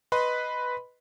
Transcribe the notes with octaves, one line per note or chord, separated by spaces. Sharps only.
B4 D#5 B5 C6